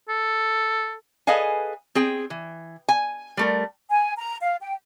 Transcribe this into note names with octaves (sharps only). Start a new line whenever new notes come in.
A4
G#4 A4 B4 D#5 F5 G#5
C4 G#4 G5
E3
G#5
G3 A3 A#4
G#5
A#5
F5
G5